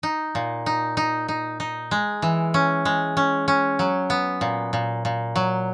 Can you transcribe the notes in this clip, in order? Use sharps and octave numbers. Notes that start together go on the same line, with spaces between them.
D#4
A#2
D#4
D#4
D#4
D#4
G#3
E3
C#4
G#3
C#4
C#4
F#3
B3
A#2
A#2
A#2
F#3